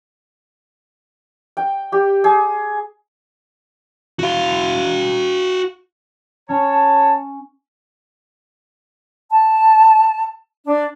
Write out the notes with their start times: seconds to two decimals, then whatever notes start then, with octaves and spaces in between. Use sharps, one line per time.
1.57 G5
1.92 G4
2.24 G#4
4.19 F#4 F5
6.49 C#4 C#5 A5 C#6
9.30 A5
10.65 D4